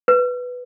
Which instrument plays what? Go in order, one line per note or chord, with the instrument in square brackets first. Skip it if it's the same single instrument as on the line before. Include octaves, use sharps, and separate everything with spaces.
[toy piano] B4